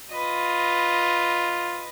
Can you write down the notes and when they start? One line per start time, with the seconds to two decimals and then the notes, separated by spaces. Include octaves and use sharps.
0.11 F4 B4 D#5